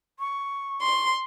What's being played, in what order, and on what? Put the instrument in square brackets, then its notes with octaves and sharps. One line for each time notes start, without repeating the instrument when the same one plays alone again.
[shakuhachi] C#6
[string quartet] C6